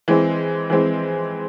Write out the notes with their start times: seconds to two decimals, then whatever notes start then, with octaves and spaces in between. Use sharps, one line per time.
0.08 E3 G#3 C4
0.70 E3 G#3 C4